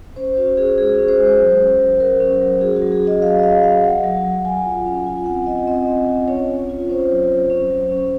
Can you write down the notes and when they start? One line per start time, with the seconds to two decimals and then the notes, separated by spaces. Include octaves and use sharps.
0.16 C#4 C5
0.37 C#4 F#4
0.57 C#4 G#4
0.78 G#3 G#4
0.99 C#4
1.08 C5
1.19 G#3
1.39 F#3
1.60 C#4
1.80 F#3
2.00 F#3 A#4
2.20 C#4
2.41 F#3
2.61 F#4 G#4
2.76 F#4
2.82 F#3
2.92 G#4
3.02 F#4
3.07 D#5
3.22 F#3 F5
3.39 D#5
3.43 F#3 F5
3.63 F#3 F5
3.84 F#3 F#5
4.04 F#3
4.24 F#3
4.45 F#3 G#5
4.65 F4
4.86 C#4
5.06 F4 G#5
5.26 C4 F#5
5.46 F4 D#5
5.67 C4 D#5
5.88 C4
6.08 F4
6.28 C#4 C#5
6.48 C#4
6.69 F4
6.89 C#4 C5
7.10 F#3
7.30 F#3
7.50 C#4
7.70 F#3
7.92 C#4